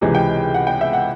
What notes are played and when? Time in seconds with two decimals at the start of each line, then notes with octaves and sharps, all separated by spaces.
0.01 C#2 C3 E3 G#3
0.15 G5
0.54 F#5
0.67 G5
0.81 E5
0.93 F#5